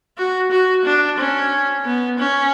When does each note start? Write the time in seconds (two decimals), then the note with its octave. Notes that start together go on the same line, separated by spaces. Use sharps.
0.18 F#4
0.52 F#4
0.85 D4
1.18 C#4
1.86 B3
2.19 C#4